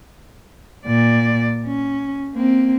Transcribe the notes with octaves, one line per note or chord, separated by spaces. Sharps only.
A#2 D5
C#4
A#3 C4